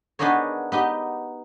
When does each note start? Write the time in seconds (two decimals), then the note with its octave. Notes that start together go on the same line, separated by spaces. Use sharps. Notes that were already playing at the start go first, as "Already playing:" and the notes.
0.19 B3 D4 D#4 G#4 A#4 C#5
0.72 B3 D#4 G4